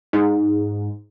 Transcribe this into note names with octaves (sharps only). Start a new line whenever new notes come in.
G#2